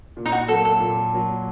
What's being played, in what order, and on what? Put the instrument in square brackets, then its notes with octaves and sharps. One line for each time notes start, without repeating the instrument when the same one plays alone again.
[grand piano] A#2
[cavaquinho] D#4
F#4
[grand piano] F#3 A#3 [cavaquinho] A4
[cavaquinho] A4
[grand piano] A#2
F#3 A#3